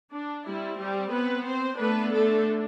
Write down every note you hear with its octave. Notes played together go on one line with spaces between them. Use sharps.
D4
G3 C4 E4
G3 G4
B3 B4
C4 C5
D3 A3 B3 D4 B4
A3 A4